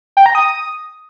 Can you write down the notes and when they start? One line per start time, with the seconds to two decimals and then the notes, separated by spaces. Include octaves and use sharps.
0.17 G5
0.26 A#5
0.35 D#6